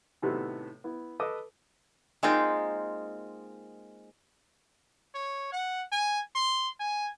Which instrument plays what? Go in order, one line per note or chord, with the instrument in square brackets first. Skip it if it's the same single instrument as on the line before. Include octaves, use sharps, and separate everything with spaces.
[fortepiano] A2 C3 D#3 B3 F#4 A4
B3 E4
A4 B4 D#5 D6 D#6
[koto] G#3 A#3 C4 D#4 F4 G5
[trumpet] C#5
F#5
G#5
C6
G#5